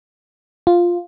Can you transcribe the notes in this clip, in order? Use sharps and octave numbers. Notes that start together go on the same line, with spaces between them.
F4